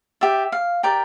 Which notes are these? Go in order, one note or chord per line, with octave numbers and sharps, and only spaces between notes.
G4 D5 E5
F5
G4 A#4 D5 G5